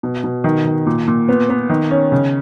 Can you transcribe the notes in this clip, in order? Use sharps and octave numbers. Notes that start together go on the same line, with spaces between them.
B2
B2
D#3
D#3
A#2
A#2
B3
B3
D#3
C#4
C#3